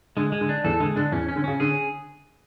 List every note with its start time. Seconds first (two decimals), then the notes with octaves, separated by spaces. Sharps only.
0.17 D3 G#3
0.32 G#3
0.41 D3
0.49 D4
0.64 E2 E3 A4
0.80 D3 G#3
0.96 D3 D4
1.12 E2 E3 C#4
1.29 C#4
1.36 D3
1.44 C#3 C#4
1.60 D3 G#4